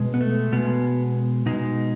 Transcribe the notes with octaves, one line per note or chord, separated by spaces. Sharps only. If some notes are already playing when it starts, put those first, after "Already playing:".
Already playing: B2 G#3
B3
A3
B2 G#3 B3
B2 G#3 D#4